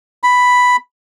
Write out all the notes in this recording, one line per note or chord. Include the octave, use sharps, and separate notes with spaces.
B5